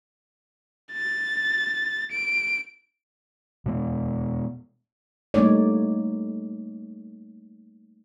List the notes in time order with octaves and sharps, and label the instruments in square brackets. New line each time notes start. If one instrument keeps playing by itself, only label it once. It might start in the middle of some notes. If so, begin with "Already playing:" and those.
[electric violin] A6
D7
[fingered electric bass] B2 G#3 B3
[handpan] G3 A3 A#3 D#4 C#5 D5